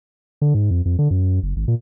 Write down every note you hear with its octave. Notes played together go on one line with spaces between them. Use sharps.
D3
G#2
F2
F2
D3
F#2
F#1
G#1
A#2